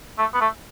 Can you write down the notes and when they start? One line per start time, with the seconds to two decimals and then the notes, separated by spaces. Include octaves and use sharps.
0.18 A3
0.34 B3
0.41 A3